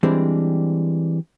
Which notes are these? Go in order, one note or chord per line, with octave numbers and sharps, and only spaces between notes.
E3 G3 G#3 C4 D4